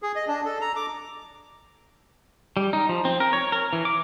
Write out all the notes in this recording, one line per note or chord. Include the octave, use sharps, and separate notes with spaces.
G#4
D#5
D4
A4
A#5
D6
G3
D#4
F3
C4
A#4
C#5
A#4
E3
D6